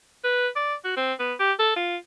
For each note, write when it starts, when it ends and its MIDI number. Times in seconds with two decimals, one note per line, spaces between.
0.24 0.48 71
0.56 0.75 74
0.85 0.94 66
0.97 1.13 60
1.19 1.34 59
1.40 1.53 67
1.59 1.72 69
1.76 1.97 65